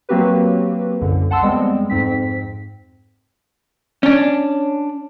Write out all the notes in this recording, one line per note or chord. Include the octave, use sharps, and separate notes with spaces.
F#3 A#3 C4 F#4 G4 B4
C2 F#2 D3
F#5 A5 C6 E6
F2 G3 G#3 B3 C4
F2 G#2 C4 B6
C#4 D4